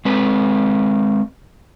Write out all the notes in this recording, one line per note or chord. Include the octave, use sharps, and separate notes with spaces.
G#3 C4 B4